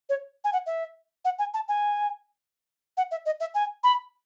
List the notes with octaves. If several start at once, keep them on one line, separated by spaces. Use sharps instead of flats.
C#5
G#5
F#5
E5
F#5
G#5
A5
G#5
F#5
E5
D#5
E5
G#5
B5